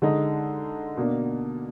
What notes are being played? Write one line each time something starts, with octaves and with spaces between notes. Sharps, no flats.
D3 G#3 D#4
B2 A#3 D4